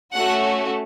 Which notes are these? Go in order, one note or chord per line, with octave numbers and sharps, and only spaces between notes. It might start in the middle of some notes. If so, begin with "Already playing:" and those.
A3 C#4 F#4 F#5